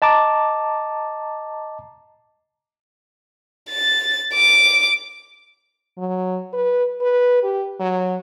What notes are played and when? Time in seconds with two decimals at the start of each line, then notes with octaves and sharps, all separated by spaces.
0.02 D#5 A5 A#5 D6
3.70 A6
4.35 D6
5.98 F#3
6.53 B4
7.01 B4
7.43 G4
7.80 F#3